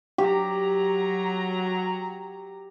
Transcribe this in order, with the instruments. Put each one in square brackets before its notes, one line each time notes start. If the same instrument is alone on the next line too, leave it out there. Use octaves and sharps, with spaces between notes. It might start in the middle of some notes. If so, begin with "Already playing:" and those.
[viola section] F#3 A#5 [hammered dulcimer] G4